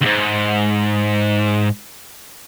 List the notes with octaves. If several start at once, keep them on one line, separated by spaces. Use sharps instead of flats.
D2 G#2